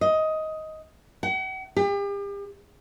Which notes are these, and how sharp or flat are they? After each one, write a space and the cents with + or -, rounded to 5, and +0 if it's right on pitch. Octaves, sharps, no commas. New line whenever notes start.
D#5 +10
F#5 +40
G4 +40